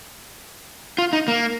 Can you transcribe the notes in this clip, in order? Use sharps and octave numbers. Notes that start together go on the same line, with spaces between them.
F4
D#4
A#3